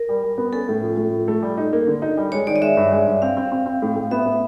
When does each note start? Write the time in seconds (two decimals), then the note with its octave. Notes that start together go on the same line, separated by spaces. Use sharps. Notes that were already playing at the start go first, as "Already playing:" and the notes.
Already playing: A#4
0.09 G3
0.23 G3
0.38 B3
0.53 C#4 A4
0.69 A2
0.83 F3
0.97 A2
1.12 F3
1.28 A3
1.42 G3
1.58 D#4
1.73 A#3
1.87 D3
2.02 D#4
2.17 G3
2.32 G#3 C#5
2.47 D#3 D5
2.56 D#5
2.61 G#3 E5
2.77 G2
2.92 G#3
3.07 G2
3.22 C4 F5
3.37 C4
3.52 C4
3.66 C4
3.82 A2
3.96 A2
4.11 B3 E5
4.26 B3